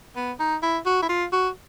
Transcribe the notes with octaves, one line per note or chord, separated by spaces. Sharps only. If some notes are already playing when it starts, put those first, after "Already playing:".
B3
D#4
E4
F#4
E4
F4
F#4